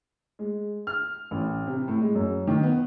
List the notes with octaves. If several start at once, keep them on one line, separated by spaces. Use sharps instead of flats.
G#3
F6
A1
C3
A2
G#3
F#2
D#3
B3